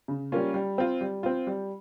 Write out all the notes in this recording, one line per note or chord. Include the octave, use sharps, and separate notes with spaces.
C#3
G3 A#3 C#4 F4
G3
C4 F4
G3
C4 F4
G3